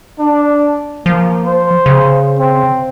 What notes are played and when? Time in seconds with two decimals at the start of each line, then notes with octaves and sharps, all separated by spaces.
0.19 D4
1.06 F3 A#3
1.44 C5
1.86 C#3
2.39 C4